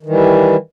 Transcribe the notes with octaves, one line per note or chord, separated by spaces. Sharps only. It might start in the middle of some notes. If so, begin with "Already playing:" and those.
D#3 E3 G3